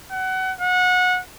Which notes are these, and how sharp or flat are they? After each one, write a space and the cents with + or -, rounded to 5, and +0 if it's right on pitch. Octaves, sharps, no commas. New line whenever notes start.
F#5 +25
F#5 -25